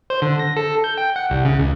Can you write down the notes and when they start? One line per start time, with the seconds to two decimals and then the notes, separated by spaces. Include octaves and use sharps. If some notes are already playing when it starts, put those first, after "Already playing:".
0.10 C5
0.22 D3
0.39 A#6
0.56 A4
0.84 G6
0.98 G5
1.16 F#5
1.30 C2
1.45 C#3
1.59 C#2